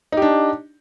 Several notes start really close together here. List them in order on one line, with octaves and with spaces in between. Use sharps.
D#4 G4 D4